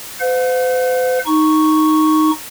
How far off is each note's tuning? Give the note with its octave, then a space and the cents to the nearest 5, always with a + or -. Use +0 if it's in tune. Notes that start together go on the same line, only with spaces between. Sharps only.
C5 -45 F5 +45
D#4 +0 C#6 +0